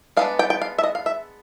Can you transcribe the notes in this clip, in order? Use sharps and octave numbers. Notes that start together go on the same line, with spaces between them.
G#3 B3 D4 F5
G5
G5
F5
E5
D#5
F5
E5